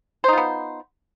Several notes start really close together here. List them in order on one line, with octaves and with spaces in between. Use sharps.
C5 D#4 F4 B3